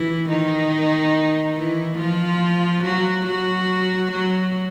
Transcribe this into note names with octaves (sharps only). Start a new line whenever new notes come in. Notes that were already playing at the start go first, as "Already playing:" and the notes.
Already playing: E3 E4
D#3 D#4
E3 E4
F3 F4
F#3 F#4
F#3 F#4
F#3 F#4